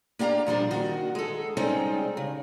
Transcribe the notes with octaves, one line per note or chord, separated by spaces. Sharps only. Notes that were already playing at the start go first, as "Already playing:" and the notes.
A#3 D4 G4 F5 A#5
A#2 F3 G3 D4
D#3 F#4
G#3 A4
G3 G#3 C4 C#4 D#4
C#3